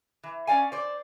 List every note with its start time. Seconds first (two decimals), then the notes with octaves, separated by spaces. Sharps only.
0.23 E3
0.47 C#4 F#4 D5 F5 G#5
0.72 C5 D5